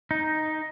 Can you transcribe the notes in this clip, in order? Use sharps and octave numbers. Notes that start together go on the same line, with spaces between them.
D#4